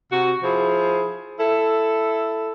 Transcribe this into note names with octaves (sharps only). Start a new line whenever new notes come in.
C3 F#4
F3 E4 G#4
E4 A4